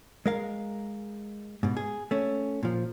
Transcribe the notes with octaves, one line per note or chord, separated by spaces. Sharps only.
G#3 A#4 F5
G#2 B2
G#4
A3 C#4
A#2 F3